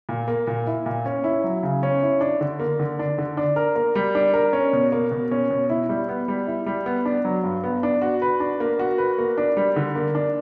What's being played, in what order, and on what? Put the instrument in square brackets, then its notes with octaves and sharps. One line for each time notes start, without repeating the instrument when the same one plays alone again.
[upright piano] A#2
A#3
A#2
E4
A#2
C#4
E4
F#3
C#3
C#4
E4
D4
D3
A#3
D3
D4
D3
D4
A#4
A#3
G3
D4
A#4
C#4
B2
A#3
B2
C#4
B2
E4
G3
B3
G3
E4
G3
B3
D4
F#3
G2
B3
D4
F#4
B4
D4
A#3
F#4
B4
A#3
D4
G3
D3
A#3
D4